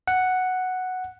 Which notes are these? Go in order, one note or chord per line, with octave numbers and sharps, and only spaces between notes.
F#5